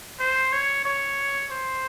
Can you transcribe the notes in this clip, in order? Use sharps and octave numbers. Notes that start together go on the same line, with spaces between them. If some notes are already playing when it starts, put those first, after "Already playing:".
C5
C#5
C#5
C5